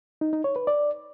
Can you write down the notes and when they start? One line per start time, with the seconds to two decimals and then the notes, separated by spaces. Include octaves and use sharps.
0.21 D#4
0.33 D#4
0.44 C#5
0.56 B4
0.67 D5